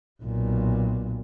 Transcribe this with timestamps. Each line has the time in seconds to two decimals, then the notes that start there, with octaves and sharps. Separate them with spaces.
0.22 B1 A#2